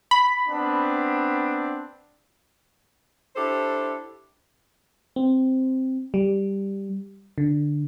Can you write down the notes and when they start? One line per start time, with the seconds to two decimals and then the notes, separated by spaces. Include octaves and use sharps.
0.11 B5
0.47 B3 C4 D4
3.36 D4 E4 G4 A4 C5
5.16 C4
6.14 G3
7.38 D3